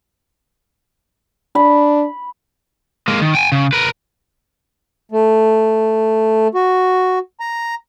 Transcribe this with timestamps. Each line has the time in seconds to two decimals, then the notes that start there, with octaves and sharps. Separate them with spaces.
1.55 D4 B5
3.08 G#3 A#3
3.21 D#3
3.35 G5 G#5
3.52 C#3
3.73 A#4 B4
5.11 A3
6.55 F#4
7.40 A#5